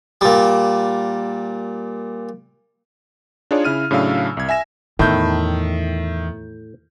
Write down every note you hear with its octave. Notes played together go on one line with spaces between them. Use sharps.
A#2 G3
D4 D#4 F4 G#4 C#5 D5
C#3 E4 F6 D#7
A2 C#3 F#3 D4 F5 E6
C2 G#6
E5 G#5 A#6 E7
E2 A2 D#3 E5 G6